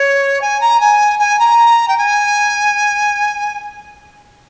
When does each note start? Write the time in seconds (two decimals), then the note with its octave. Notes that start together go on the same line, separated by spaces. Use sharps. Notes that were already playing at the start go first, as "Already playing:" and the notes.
Already playing: C#5
0.41 G#5
0.61 A#5
0.80 G#5
1.19 G#5
1.39 A#5
1.88 G5
1.98 G#5